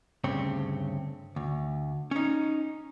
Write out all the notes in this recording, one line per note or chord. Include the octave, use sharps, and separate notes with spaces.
D2 G2 C#3 C4 C#5
D2
C#4 D#4